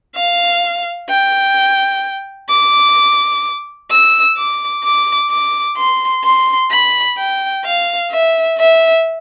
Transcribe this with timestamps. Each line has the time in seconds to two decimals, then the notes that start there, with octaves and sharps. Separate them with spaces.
0.16 F5
1.09 G5
2.50 D6
3.91 E6
4.37 D6
4.84 D6
5.30 D6
5.77 C6
6.24 C6
6.70 B5
7.17 G5
7.64 F5
8.11 E5
8.58 E5